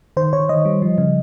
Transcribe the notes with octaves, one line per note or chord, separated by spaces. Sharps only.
D#3 C5
D#3 C#5
D#3 D#5
G3
F3
C#3